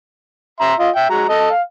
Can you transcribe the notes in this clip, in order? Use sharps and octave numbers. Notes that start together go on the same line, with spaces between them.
E5 A#5 C6
F4 D#5
E5 G5
G#3 F#4 A#5
A4 D#5
F5